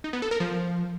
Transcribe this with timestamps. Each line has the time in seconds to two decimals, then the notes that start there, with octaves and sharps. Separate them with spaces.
0.04 D#4
0.13 B3
0.22 A4
0.31 A#4
0.40 F3